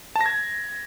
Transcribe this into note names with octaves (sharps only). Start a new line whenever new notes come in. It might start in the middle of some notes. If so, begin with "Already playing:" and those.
A5
A#6
G#6